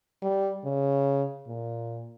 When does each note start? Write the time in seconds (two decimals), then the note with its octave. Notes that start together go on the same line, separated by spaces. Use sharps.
0.22 G3
0.64 C#3
1.48 A#2